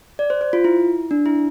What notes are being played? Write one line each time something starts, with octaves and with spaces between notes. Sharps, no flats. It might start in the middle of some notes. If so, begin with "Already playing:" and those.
D5
C5
C5
F4
E4
D4
E4